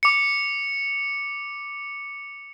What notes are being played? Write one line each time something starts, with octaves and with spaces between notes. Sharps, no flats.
D6 C#7